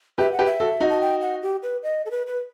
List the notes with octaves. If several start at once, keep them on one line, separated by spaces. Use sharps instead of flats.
G4 B4 E5
F#5
G4 B4
E5
F#4 A4
D#4 F#4
A5
G5
F#5
G4
B4
D#5
A4
B4
B4